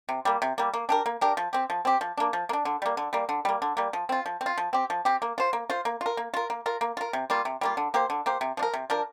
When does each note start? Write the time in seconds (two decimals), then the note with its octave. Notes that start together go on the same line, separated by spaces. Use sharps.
0.09 C3
0.25 G3 A#3
0.42 C3
0.58 G3 A#3
0.74 A#3
0.89 D4 G4 A#4
1.06 A#3
1.21 D4 G4 A#4
1.37 F3
1.53 C4 G4
1.70 F3
1.85 C4 G4
2.01 F3
2.18 A#3 D4
2.33 F3
2.49 A#3
2.53 D4
2.65 D3
2.82 G3 A#3
2.97 D3
3.13 G3 A#3
3.29 D3
3.45 G3 A#3
3.62 D3
3.77 G3 A#3
3.93 F3
4.09 C4 F4
4.26 F3
4.41 C4
4.46 F4
4.58 F3
4.73 C4 G4
4.90 F3
5.05 C4 G4
5.22 A#3
5.38 F4 C5
5.53 A#3
5.70 F4 C5
5.85 A#3
6.01 F4 A#4
6.17 A#3
6.34 F4 A#4
6.50 A#3
6.66 F4 A#4
6.81 A#3
6.97 F4 A#4
7.13 C3
7.30 G3 A#3 F4
7.45 C3
7.61 G3 A#3 F4
7.77 D3
7.94 A#3 G4 C5
8.10 D3
8.26 A#3 G4 C5
8.41 C3
8.57 F3 D4
8.63 A#4
8.74 C3
8.90 F3 D4 A#4